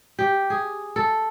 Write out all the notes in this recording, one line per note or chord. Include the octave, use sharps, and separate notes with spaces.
G4
G#4
A4